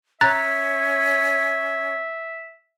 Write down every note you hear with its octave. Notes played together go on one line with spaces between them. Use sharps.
C#4 E5 A#5 F#6 A6